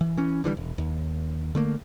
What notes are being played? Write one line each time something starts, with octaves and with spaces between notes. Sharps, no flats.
E3
E3 C#4
D3 E3 F3 G3
E1
D#2
D3 A3 A#3